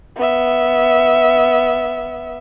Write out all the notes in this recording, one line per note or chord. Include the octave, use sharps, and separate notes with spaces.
B3 E5